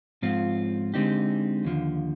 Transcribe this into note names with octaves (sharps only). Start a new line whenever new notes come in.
G#2 F3 C4 F4
D3 G#3 C4 D#4 G4
D#2 D3 F3